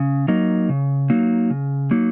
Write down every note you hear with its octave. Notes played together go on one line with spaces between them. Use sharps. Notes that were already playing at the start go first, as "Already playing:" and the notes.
Already playing: C#3
F#3 A#3 D#4
C#3
F#3 A#3 D#4
C#3
F#3 A#3 D#4